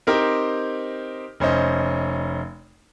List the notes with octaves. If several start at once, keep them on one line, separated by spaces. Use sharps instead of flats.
C4 D#4 G4 A#4 C5
F1 C#4 C5 D#5